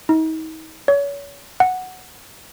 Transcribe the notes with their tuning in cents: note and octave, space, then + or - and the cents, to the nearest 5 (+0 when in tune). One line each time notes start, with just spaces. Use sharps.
D#4 +40
C#5 +35
F#5 +0